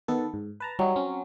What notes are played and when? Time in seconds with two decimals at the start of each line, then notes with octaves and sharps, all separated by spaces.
0.08 D#3 B3 A4
0.34 G#2
0.60 B4 A5 A#5
0.79 F#3 G3 D#4
0.96 C4 C#4